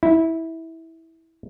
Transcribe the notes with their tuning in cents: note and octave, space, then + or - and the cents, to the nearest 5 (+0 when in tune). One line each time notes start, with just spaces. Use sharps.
E4 -15